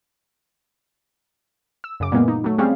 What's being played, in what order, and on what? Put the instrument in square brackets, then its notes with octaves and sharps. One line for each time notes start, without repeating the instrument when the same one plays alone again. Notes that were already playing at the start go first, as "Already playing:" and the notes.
[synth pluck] E6
F#2 C#3 D6
A#2 E3 G#3 A#3 B3
D#4
F#3 A3
G3 C4 C#4 G#4 F5